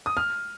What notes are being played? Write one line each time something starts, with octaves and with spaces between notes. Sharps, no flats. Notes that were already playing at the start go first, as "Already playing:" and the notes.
D#6
F6